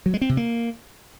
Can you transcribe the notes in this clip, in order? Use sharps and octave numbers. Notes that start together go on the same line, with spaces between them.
F#3
G#3
C4
C3
A#3